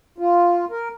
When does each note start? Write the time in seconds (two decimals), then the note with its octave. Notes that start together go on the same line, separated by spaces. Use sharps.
0.18 F4
0.70 A#4